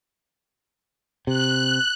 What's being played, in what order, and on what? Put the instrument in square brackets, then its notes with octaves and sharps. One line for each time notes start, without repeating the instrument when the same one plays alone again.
[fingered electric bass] C3 [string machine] F#6